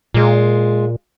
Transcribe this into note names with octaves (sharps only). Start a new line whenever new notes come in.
A#2 G#3 F4